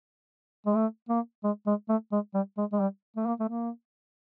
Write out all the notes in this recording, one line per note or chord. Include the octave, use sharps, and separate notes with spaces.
G#3
A3
A#3
G#3
G#3
A3
G#3
G3
G#3
G#3
G3
A3
A#3
A3
A#3